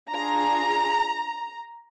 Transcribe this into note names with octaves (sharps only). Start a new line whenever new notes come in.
D4 F4 G#4 A#5